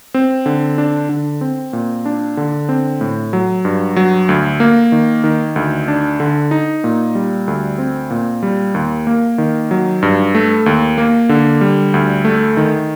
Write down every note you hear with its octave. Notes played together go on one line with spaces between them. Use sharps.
C4
D3
D4
D3
C4
A#2
D4
D3
C4
A2
F#3
G2
F#3
D2
A#3
D#3
D#3
D2
D4
D3
D#4
A#2
G3
D2
C4
A#2
G3
D#2
A#3
D#3
F#3
G2
A3
D#2
A#3
D3
G3
D2
A3
D#3